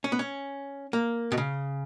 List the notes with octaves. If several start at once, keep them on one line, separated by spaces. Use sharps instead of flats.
C#4
B3
C#4
A#3
B2
C#3